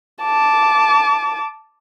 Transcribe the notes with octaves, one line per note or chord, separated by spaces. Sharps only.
A5 D6